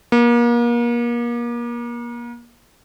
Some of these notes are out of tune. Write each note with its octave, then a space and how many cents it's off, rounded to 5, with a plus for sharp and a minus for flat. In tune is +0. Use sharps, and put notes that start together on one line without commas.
A#3 +35